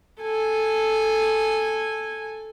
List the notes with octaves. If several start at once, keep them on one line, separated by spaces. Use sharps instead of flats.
A4 G#5